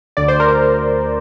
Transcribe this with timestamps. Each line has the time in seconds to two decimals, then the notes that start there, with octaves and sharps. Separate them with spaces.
0.17 D2 D5
0.28 C5
0.40 A#4